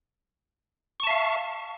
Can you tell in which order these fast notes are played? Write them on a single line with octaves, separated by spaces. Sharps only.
C#6 A5 E5 F5